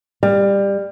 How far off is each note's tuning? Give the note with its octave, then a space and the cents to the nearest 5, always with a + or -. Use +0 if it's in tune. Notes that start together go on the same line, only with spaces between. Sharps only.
G3 +20